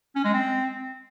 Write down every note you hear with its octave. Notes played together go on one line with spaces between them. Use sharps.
C#4
G#3
C4